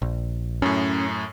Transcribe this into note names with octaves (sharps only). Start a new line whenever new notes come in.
A#1
F#2 A2 C#4